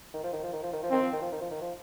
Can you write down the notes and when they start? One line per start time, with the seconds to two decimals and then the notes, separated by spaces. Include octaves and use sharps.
0.14 D#3
0.23 F3
0.33 D#3
0.43 F3
0.53 D#3
0.63 F3
0.73 D#3
0.83 F3
0.90 D#3 C4
1.02 F3
1.12 D#3
1.22 F3
1.32 D#3
1.41 F3
1.51 D#3
1.61 F3